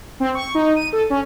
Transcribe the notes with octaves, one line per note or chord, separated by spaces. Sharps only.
C4
C#6
D#4
D#7
A4
C#4